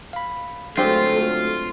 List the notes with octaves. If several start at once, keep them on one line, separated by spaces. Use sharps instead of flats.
F5 B5
D3 F#3 G#3 A3 C4 D4 F4 G4